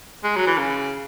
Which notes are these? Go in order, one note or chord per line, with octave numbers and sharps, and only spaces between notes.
G#3
F#3
E3
C#3